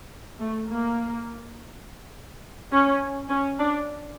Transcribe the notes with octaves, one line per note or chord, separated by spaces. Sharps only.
A3
A#3
C#4
C#4
D4